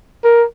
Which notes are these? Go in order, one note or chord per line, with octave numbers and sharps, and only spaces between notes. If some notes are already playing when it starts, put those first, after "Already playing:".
A#4